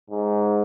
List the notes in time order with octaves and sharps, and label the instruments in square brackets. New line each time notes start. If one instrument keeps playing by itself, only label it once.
[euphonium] G#2